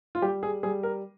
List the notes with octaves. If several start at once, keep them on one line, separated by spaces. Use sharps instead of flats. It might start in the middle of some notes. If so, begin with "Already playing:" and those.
F4
G3 G4
G#4
G3 G#4
A#4